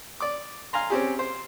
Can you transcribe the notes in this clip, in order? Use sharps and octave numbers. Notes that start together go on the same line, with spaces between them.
D5 D6
F5 G#5 A#5 C6
C4 C#4 G4 G#4
C5